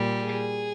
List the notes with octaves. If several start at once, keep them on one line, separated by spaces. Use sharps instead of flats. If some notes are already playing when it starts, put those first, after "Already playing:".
Already playing: A#2 G3
G#4